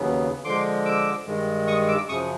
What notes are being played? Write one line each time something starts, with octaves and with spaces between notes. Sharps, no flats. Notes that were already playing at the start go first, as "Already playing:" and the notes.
Already playing: D#2 C#3 F#3 B3
D3 F3 G#3 C6 D6
D6 E6
G2 D#3 G#3
C#6 D#6
D6 E6
F#2 C#3 F3 C#6 D#6